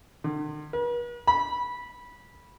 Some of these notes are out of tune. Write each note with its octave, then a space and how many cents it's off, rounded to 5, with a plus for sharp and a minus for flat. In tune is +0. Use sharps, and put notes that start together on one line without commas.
D3 +45
B4 -45
B5 -15